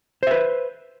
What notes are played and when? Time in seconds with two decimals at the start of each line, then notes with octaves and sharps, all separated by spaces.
0.23 C5
0.27 E5
0.31 B4